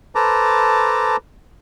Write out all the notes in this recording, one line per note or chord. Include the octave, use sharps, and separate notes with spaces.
A4 B4 C5 A5 A#5 D6